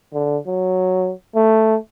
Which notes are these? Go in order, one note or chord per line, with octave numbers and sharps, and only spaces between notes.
D3
F#3
A3